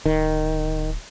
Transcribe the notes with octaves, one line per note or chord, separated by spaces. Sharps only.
D1 D#3